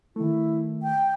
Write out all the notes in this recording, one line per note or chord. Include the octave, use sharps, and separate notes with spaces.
D#3 A3 E4
G5